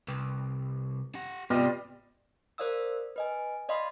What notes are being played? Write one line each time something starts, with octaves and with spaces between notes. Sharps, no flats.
C2 B4 G5
G4 F#5
G#2 C3 G3 B3 F4 D5 D#5
A#4 C5 D5 F5 D#6 E6
B4 D#5 G#5
D5 D#5 F5 B5 C6 D#6